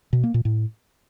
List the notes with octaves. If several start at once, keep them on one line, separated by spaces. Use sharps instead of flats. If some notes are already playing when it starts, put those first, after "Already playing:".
B2
A#3
A#2
A2